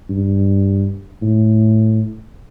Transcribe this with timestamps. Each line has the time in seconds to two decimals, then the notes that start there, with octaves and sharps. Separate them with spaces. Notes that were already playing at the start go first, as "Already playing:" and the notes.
0.10 G2
1.22 A2